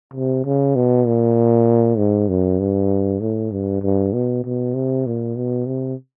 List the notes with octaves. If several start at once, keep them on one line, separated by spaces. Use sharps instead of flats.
C3
C#3
B2
A#2
G#2
F#2
G2
A2
G2
G2
B2
B2
C3
A#2
B2
C3